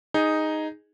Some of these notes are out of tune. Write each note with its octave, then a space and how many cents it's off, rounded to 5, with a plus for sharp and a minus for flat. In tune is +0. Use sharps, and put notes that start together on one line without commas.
D#4 +0 G#4 -5